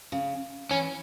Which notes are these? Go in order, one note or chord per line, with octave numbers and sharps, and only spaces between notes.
C#3
E3 C#4